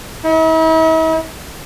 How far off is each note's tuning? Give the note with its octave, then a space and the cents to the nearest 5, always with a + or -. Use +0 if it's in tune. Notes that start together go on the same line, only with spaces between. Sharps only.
E4 -45